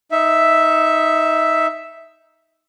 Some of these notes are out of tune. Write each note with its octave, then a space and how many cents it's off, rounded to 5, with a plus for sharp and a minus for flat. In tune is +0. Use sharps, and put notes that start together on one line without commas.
D#4 +15 E5 +0